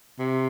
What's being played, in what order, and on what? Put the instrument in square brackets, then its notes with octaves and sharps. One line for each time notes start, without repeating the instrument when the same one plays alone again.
[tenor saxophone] C3